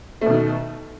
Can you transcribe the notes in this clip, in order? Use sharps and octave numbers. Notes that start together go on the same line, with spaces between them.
B2 D#3 A3